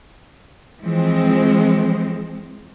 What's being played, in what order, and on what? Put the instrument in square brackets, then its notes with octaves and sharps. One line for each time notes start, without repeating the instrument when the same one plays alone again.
[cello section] E3 F3 G#3 C4